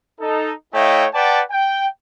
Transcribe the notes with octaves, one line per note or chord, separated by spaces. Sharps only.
D#4 A4
A3 E4 C#5 D#5 F5 G5
B4 D5 F#5 G5 A5
G5